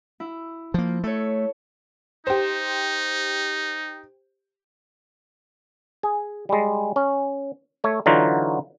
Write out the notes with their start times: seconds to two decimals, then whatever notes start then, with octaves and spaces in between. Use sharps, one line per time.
0.20 E4
0.74 F3 A#3
1.04 A3 A4 C#5
2.27 D#4 G4 C5
6.03 G#4
6.49 G3 G#3
6.96 C#4
7.84 A3 C#5
8.06 D3 E3 F#3 D#4 F4 F#4